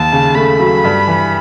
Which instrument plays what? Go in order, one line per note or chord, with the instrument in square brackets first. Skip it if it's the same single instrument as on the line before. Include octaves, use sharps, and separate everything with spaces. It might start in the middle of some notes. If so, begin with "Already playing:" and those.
Already playing: [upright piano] D#2 [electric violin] A5
[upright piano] C#3
[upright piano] A3 [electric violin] B5
[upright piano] F#3
G2
E3